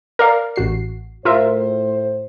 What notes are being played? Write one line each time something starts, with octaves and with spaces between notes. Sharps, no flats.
A#4 D5 F5
A1 F#4 C7
A2 F4 A#4 C5 E5